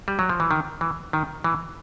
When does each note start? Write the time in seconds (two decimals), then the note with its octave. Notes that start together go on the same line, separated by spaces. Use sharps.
0.08 G3
0.19 F#3
0.29 F3
0.40 E3
0.51 D#3
0.81 E3
1.13 D#3
1.44 E3